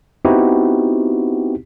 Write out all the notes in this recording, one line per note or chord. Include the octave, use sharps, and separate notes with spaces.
B3 C4 D#4 E4 F#4 G4